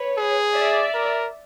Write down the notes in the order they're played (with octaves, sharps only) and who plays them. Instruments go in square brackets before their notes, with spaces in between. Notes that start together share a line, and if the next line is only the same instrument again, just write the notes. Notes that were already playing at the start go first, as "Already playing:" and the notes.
Already playing: [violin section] B4 C#5
[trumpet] G#4
[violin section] D5 E5
[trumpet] A#4